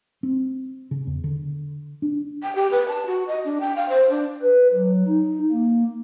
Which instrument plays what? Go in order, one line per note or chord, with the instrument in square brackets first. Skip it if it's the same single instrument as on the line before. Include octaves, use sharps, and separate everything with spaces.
[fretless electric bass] C4
C#3
E2
D3
D4
[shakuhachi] G5
G4
B4
A5
F#4
D#5
D4
G5
F5
C5
D4
[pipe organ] B4
F#3
D#4
A#3